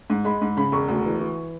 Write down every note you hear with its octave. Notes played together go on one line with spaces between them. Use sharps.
G#2
G#3 B5
G#2
C#3 B5
E1 C#6
D2
E3
E3